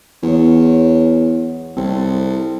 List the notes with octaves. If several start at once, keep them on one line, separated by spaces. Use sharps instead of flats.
E2 F#3 G#3 C#5
C2 C4 A4